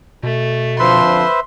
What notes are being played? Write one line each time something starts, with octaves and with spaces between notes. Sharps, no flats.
B2 A3
F2 D3 F3 B4 C5 E5 C6